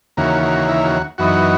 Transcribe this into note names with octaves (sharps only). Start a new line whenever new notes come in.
D#2 C#3 E3 A#3 F#4
F#4
E4
F#4
F#2 E3 B3 D#4 F#4